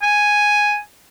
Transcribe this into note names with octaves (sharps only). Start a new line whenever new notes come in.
G#5